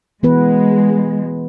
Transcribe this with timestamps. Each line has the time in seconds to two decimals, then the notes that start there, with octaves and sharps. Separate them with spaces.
0.23 E3 G#3 B3 B4